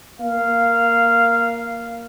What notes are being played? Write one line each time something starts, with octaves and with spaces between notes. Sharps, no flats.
A#3 F5